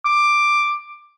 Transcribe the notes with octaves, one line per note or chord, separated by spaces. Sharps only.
D6